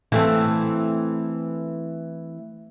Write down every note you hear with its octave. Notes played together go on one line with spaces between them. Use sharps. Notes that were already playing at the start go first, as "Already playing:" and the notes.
E3 A3 C4